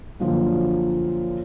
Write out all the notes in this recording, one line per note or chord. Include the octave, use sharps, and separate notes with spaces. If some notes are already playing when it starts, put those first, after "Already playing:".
F#2 A#2 D3 F3 F#3